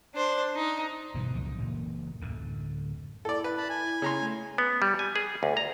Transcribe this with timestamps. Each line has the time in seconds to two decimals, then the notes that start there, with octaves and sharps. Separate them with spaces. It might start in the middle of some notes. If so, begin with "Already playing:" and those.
0.14 D4 C5
0.56 D#4
1.14 G1 G2 B2 E3
1.33 C#2 F#2 A#2 F3
1.58 F#1 A#2 E3 A#3
2.21 D1 F#2 D3
3.25 E4 A4 D5
3.44 B4
3.57 A5 B5
3.69 G#5
4.02 C#3 A#5 C6
4.20 A3
4.58 B3
4.82 G3
4.99 G#5
5.16 G#4
5.43 D2
5.57 A#5